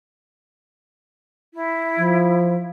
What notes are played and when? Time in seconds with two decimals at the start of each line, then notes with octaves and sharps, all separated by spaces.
1.53 E4
1.98 F3